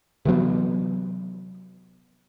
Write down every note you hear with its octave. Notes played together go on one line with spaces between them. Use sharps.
C3 E3 F#3 B3